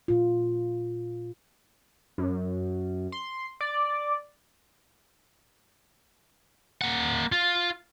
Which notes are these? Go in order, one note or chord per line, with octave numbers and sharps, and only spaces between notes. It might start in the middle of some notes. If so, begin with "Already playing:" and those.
A#2 F4
F#2
C6
D5
A#3 F#5
F4